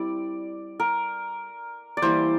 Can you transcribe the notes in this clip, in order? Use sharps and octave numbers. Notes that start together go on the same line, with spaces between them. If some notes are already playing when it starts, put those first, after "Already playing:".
Already playing: G3 C4 E4 D5
A#4
D5
E3 G3 A#3 E4 C5